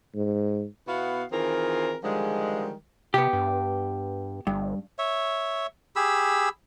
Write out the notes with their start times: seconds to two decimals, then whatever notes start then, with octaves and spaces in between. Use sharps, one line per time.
0.15 G#2
0.87 B2 B3 E4 F#4 F5
1.31 D#3 E3 C4 F4 G#4 A#4
2.03 D3 D#3 F3 G3 G#3
3.14 C3 B3 G4
3.33 G2
4.47 G1 G2
4.99 C#5 E5
5.96 G4 G#4 B5 E6